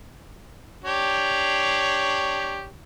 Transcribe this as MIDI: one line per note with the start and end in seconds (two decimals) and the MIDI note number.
0.84 2.68 62
0.84 2.68 67
0.84 2.68 73